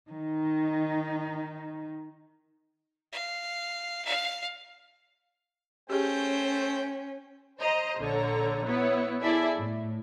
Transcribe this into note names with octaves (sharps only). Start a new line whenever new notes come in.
D#3 D#4
F5
F5
A3 C#4 G4 G#4 C5 G5
C5 D#5 A#5
A#1 D3 A4 C#5 A#5
B3 E4 C#5
E4 G#4 A4 D5 E5
A2